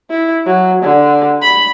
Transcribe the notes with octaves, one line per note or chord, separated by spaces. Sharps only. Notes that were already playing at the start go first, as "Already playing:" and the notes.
E4
F#3
D3
B5